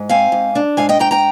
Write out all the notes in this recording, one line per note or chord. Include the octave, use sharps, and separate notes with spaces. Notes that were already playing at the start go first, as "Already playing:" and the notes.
Already playing: G#2
C4 F5 G#5
G#2
D4
G#2 F5 G#5
D#5 G5
G#2 G5 A#5
G5 A#5